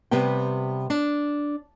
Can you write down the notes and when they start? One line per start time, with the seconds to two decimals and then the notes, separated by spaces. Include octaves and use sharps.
0.11 C3 G3 B3 B4 G5
0.90 D4